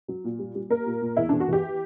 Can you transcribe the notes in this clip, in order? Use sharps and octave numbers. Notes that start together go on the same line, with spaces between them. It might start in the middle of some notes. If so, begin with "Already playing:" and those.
F#3
A#2
G3
G3
A#3 A#4
A#2
A#2
E2 E4
E2 D4
F#4
E3 G4